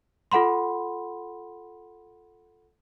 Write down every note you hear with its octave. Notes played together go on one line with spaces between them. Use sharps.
F4 A4 F#5 B5 C6